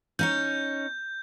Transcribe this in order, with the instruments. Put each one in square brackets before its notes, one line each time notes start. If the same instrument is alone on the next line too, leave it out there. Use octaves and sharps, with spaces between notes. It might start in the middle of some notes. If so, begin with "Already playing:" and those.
[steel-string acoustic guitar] C#4 D#4 C#5 [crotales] G6